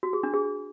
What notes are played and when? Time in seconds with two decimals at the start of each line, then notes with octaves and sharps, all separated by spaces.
0.03 F#4
0.13 G#4
0.23 D4
0.34 G#4